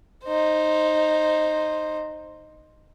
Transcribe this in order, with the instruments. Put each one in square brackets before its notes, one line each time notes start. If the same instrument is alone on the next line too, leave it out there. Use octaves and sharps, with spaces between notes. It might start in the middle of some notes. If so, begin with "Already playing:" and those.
[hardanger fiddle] D#4 C5